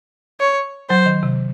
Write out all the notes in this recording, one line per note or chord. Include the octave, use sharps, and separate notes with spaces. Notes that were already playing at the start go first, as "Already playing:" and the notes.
C#5
F#3 C5
D#3
C3